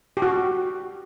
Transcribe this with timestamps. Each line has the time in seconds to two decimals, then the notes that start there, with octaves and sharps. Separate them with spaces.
0.17 G4
0.22 F#4
0.28 G4